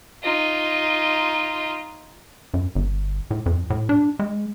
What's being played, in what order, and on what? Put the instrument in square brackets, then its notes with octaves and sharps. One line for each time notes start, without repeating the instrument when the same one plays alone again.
[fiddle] D#4 F4
[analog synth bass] F#2
G1
A2
F2
A2
D4
G#3